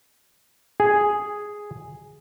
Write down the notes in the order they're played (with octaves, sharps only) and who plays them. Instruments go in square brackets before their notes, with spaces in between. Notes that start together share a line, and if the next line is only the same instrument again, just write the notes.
[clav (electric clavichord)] G#4